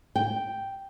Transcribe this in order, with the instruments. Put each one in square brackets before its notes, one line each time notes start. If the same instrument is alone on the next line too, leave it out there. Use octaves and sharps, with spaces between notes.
[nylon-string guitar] G5